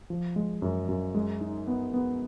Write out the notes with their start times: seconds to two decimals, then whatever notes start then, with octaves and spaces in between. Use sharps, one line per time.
0.10 F3
0.36 G#3
0.62 F#2
0.89 F#2
1.15 G#3
1.41 D#4
1.68 B3
1.94 B3